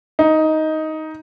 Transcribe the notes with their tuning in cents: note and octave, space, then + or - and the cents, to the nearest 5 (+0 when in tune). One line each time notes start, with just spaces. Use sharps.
D#4 +10